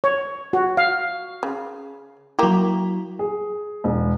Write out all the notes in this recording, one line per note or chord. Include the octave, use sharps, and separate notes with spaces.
C#5
F#4
F5
C#3
F#3 A#3 E4 G4
G#4
E1